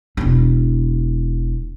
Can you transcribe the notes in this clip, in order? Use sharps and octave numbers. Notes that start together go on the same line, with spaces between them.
E1 E4